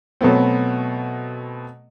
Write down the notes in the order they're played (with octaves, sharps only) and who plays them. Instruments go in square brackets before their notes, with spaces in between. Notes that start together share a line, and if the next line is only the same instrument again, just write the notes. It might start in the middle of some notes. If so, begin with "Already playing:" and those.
[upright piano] B2 F#3 A3 B3 C4